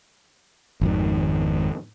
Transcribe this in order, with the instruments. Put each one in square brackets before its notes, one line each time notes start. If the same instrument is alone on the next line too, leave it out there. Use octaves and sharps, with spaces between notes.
[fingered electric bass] G#1 F2 D#3